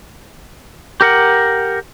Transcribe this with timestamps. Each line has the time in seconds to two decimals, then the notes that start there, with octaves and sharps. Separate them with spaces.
1.01 G4 A#4 F#5